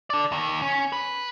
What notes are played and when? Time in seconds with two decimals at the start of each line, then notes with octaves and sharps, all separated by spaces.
0.10 A4 D5
0.32 D#2 D#3
0.62 C#4
0.93 B4